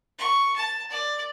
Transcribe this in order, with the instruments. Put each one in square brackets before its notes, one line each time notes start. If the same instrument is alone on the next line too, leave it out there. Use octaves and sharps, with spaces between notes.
[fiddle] C#6
A5
D5